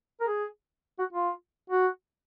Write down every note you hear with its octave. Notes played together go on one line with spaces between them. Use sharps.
A#4
G#4
F#4
F4
F#4